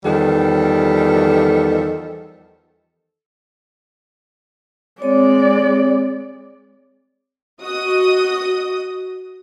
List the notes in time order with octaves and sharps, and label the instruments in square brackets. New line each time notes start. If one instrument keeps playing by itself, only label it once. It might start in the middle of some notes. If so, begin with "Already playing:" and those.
[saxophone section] E2 D#3 F3 G3 A4
[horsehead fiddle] G#3 D5 [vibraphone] C4 C#5
[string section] F#4 D#5 D#6